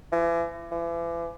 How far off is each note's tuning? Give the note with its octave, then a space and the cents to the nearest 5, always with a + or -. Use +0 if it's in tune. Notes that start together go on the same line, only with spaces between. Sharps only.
E3 +40
E3 +40